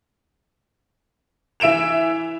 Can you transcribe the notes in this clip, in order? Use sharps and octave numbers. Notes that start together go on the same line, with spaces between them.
E3 E5 D7 E7 F7